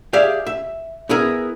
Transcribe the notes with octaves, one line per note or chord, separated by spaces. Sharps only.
G4 G#4 D5 E5 F5
E5
B3 E4 G#4 A#4